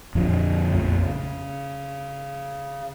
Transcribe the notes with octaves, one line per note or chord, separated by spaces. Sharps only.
F2 A#2 D3
A#1 F2 A3
C#3